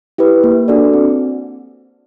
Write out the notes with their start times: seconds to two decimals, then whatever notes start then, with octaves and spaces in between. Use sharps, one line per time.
0.18 E4 G4 B4
0.44 A#3
0.68 D4 F#4 A4 D5
0.93 C4